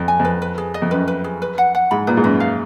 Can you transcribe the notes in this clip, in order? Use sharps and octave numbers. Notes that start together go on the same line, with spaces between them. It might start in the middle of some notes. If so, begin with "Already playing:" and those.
Already playing: F2
G#5
F2
B4
B4
G#4
D#5
F2
F#2 B4
B4
G#4
B4
F#5
F#5
G#2 B5
A#2 B4
G#2
F#2 B4
F5